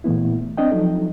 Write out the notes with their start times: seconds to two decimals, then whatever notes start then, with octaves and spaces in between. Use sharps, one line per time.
0.04 A#2 E3 A3 B3 E4
0.57 C4 D4 D#5 G5
0.71 F3 F#3 D#4 A4